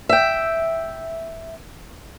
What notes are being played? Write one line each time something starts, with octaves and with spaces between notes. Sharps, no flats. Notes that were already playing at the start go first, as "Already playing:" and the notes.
E5 G5